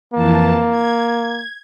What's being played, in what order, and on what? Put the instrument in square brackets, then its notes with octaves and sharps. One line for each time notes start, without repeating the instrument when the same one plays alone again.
[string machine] F2 E3 A5 [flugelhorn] A#3
[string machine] G#6